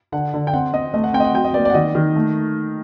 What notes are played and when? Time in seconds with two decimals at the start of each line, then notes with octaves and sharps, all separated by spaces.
0.12 D3 F#5
0.34 D3
0.47 G5
0.53 C4 F#5
0.73 C4 D#5
0.94 A3 D#5
1.04 F#5
1.14 C4 G5
1.20 D#5
1.25 F#5
1.34 F#3 G5
1.45 D#5
1.54 A#3 D5
1.65 D5 F#5
1.74 D#3 D#5
1.95 D#3
2.16 A3